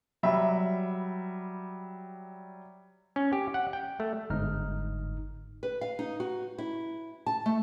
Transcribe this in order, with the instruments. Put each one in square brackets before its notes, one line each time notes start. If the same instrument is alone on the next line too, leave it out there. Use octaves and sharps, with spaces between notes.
[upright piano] F#3 G3 E5 B5
[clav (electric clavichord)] C#4
G4
F#5
G5
A3
[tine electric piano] G1 G#2 D#4 F6
[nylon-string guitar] B4
F5
D#4
F#4
E4
A5
A3